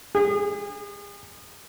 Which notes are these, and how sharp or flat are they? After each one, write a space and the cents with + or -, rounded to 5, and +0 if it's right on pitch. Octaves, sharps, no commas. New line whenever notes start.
G#4 -40